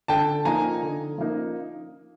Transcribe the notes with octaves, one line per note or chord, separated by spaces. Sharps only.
D3 G5 A5
F3 A#3 D#4 G#5 A#5
D3
F3 A#3 D#4